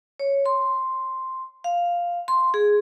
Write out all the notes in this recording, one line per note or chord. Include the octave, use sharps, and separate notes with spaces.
C#5
C6
F5
C6
G#4